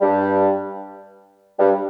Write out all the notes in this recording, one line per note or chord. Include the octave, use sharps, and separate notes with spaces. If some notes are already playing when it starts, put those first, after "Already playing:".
G2 G3
G2 G3